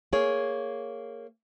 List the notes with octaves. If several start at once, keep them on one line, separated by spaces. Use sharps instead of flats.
A#3 G#4 C#5